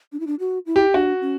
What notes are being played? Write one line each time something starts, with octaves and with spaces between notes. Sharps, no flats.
D4
E4
D4
F#4
E4
G4
D4 F#4
C#4